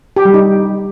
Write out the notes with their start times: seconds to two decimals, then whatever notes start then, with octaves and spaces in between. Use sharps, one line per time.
0.16 G4
0.25 G3
0.34 D#4